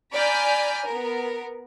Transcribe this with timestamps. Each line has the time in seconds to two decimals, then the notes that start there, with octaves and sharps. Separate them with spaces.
0.12 D5 G#5 A#5 B5 F6 G6
0.87 B3 A#4